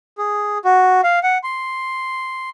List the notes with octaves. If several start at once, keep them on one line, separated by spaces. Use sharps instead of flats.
G#4
F#4
F5
F#5
C6